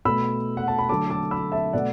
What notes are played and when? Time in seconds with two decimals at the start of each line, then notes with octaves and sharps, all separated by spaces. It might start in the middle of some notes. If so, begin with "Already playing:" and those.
0.05 B2 A3 B5 E6
0.57 F#5
0.68 A5
0.78 B5
0.89 D3 F#3 A3 A5 D6
1.10 A5 D6
1.31 B5 E6
1.52 E5 A5
1.73 B2 A3 D5 F#5